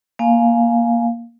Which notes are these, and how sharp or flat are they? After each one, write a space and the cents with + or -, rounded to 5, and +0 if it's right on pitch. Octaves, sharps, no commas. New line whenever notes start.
A#3 +10 F5 +0 G#5 +15